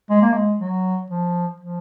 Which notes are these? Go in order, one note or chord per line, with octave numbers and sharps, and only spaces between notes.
G#3
A#3
G#3
F#3
F3
F3